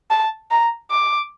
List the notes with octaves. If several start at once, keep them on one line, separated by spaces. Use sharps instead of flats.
A5
A#5
D6